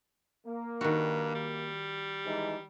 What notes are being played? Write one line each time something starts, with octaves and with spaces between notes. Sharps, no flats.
A#3
G2 D#3 F#4
G3
E3 G#3 D#4